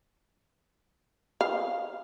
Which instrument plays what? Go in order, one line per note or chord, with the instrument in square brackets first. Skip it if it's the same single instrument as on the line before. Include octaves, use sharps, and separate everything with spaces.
[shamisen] F5